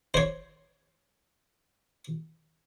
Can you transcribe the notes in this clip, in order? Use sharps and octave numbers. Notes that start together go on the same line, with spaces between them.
C5 C#5